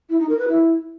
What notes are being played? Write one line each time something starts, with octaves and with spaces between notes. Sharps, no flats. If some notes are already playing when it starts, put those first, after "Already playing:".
E4
D#4
A#4
B4
E4